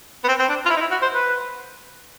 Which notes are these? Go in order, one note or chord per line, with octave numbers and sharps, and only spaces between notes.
B3
C4
C4
D4
F4
E4
D#4
E4
F#4
C5
B4